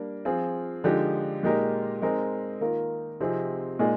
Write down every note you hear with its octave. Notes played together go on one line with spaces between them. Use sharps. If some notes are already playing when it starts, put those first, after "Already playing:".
Already playing: G3 A#3 D4
F3 C4 F4 G#4
D3 F3 G#3 D#4 G4
A#2 G#3 D#4 G4 A#4
G#3 C4 D#4 A#4
D#3 A#3 F4 A#4
C3 F3 C4 D#4 G#4
A#2 G#3 D#4 G#4